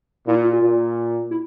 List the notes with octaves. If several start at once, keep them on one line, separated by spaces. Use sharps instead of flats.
A#2 E4
F4
F4
A#2
E4